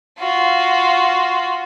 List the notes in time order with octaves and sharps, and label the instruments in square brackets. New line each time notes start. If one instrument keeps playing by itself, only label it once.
[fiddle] F4 F#4